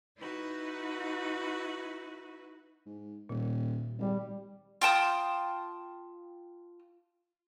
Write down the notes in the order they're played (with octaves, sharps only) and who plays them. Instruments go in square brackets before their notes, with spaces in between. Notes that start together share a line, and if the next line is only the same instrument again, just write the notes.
[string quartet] D#4 E4 F#4 B4
[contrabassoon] G#2
[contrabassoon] D#1 [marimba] A#2
[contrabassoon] G#1 [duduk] G3
[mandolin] F4 G5 A5 D#6